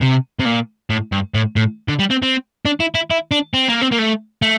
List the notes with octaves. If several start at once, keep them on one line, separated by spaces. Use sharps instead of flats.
C3
C3
A#2
A2
G2
A2
A2
D3
G3
C4
C4
D4
E4
E4
E4
D4
C4
A#3
C4
A#3
A3
A3